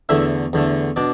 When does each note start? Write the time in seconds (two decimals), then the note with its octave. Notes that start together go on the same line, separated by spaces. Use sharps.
0.09 E2 D3 A3 E4 E5
0.53 E2 D3 A3
0.96 B2 D4 D5